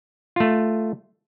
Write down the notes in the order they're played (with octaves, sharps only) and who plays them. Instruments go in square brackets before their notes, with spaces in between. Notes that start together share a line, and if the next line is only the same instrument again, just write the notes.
[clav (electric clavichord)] A3 F4